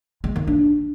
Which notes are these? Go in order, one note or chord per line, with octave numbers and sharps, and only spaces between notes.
G#3
D#3
D4